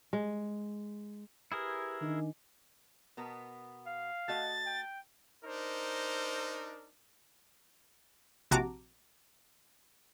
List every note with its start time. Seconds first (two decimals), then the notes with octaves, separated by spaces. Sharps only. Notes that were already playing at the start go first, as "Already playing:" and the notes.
0.13 G#3
1.52 E4 G4 G#4 A#4 B4
2.01 D#3 D4 D#5 G#5
3.17 B2 B3 A#4
3.86 F5
4.28 A3 F#4 D#5 A6
4.66 G5
5.44 D4 D#4 A#4 C5
8.51 A#1 C3 F#4 A5 A#5 D6